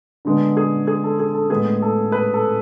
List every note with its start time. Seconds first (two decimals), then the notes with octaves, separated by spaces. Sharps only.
0.25 D3 G#3 B3
0.57 G#4
0.87 G#4
1.04 A4
1.19 G#4
1.34 A4
1.50 A2 G#3 B3 G#4
1.82 A4
2.12 B4
2.34 A4